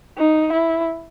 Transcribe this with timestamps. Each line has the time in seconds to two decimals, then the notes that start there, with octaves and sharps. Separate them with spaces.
0.18 D#4
0.52 E4